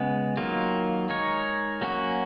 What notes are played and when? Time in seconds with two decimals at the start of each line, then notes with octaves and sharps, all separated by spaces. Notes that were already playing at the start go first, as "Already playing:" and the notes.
Already playing: C#3 G#3 B3
0.37 D#3 F#3 A#3 F4
1.09 G#3 D#4 A#4 C#5
1.81 F#3 A#3 C#4 F#4